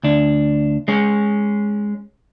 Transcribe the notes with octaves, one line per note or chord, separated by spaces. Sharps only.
D2 D4
G#3 C#4